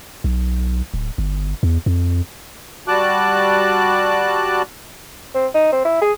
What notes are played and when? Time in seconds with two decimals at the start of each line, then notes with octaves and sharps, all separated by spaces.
0.24 B1
0.94 D1
1.18 G1
1.63 E2
1.86 F2
2.88 G3 F#4 A5 D6 F#6
5.35 C4
5.54 D#4
5.72 C4
5.85 E4
6.02 G#4